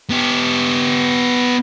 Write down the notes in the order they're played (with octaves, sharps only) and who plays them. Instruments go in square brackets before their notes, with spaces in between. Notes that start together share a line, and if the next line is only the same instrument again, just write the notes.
[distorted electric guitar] B3 G4